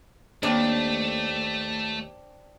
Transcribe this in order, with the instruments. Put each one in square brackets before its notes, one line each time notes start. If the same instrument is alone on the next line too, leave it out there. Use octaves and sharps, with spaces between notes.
[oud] D#2 [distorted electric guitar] A3 [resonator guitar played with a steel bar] C4 D4